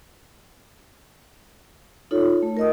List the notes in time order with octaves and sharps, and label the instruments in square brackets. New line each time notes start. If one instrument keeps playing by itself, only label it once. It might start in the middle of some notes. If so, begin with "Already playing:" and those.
[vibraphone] D#4 F4 A4 C#5
A3
A#4 D#5 D#6